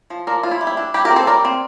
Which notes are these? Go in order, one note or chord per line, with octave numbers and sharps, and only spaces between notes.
F3
F3 A#4 D5
F3 F4
E4
G3
E4
D4
G3 E4 G4
G4 A#4
C4
A4 C5
G3 A#4 D5
C4